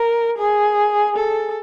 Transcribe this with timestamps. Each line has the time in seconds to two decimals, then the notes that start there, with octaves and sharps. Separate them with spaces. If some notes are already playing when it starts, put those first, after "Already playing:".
Already playing: A#4
0.38 G#4
1.17 A4